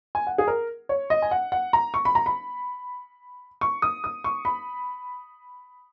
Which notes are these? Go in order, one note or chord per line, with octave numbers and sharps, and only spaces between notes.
G#5
F#5
G#4
A#4
C#5
D#5
G#5
F#5
F#5
A#5
C#6
B5
A#5
B5
C#6
D#6
D#6
C#6
B5